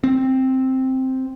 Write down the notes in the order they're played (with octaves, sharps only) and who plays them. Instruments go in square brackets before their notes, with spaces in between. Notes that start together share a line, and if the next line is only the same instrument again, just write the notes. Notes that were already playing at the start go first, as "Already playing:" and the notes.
[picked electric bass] C4